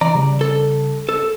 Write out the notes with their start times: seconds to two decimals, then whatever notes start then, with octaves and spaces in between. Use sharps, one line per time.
0.01 E3 D5 A#5
0.15 C#3 G3
0.41 A4
1.09 A4